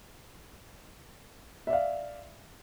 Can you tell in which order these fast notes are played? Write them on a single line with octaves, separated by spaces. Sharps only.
E5 D5 F5